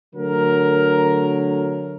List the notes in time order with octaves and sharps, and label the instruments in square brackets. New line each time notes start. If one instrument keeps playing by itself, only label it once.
[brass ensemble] D3 F#3 A3 A#4